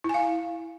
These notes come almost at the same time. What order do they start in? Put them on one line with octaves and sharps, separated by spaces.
E4 G#5 F5